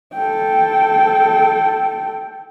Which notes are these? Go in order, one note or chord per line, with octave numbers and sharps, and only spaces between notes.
A4 G5